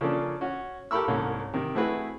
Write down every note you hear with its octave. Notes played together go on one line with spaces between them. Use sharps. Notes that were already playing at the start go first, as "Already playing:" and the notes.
C#3 F3 A#3 C#4 D4 A4
C#4 F#4
G4 A4 A#4 B5 C#6 E6
C2 G#2 A#3 C#4 A4
C3 D#3
A3 C4 E4 F#4 G#4 B4